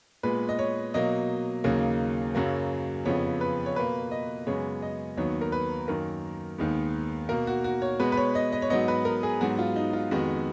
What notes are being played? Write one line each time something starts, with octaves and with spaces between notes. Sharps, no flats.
A#2 G#3 B3 B4
D#5
C#5
B2 F#3 A#3 D#5
D#2 C#3 F#3 A#3
F#2 C#3 F#3 A#3
F2 C#3 F3 B3 C#5
B4
C#5
B2 A#3 B4
D#5
F#2 C#3 G#3 B3 C#5
D#5
D#2 D#3 F#3 B3 C#5
A#4
B4
F#2 D#3 A#3 A#4
D#2 D#3 G#3 B3
B2 A#3 A#4
F#4
F#4
C#5
B2 G#3 B3 B4
B4
C#5
D#5
D#5
C#5
G#2 F#3 B3 D#5
B4
A#4
G#4
G#2 F#3 B3 F#4
F4
D#4
F4
F2 D#3 G#3 B3 F#4